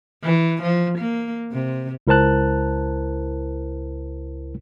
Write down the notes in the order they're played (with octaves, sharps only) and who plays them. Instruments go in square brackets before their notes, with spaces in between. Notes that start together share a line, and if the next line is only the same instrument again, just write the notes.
[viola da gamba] E3
F3
A#3
C3
[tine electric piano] C#2 E4 A#4 C5 A5 F#6